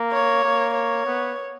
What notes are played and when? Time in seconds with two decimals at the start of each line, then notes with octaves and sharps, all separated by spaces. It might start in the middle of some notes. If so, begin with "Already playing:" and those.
Already playing: A#3
0.12 C#5
0.44 A#3
0.75 C#5
1.06 B3